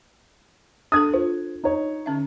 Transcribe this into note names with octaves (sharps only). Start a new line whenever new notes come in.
D4 A4 D#6 G#6
F4 C5
D#4 C#5
D3 C#4 E5